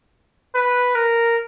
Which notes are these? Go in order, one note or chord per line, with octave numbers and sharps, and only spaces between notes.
B4
A#4